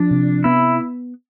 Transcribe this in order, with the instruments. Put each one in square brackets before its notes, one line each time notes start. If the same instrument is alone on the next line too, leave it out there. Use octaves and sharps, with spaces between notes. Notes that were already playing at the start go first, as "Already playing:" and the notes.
Already playing: [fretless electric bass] F3 [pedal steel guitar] D4
[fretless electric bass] C3
[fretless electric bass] B3 [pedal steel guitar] E4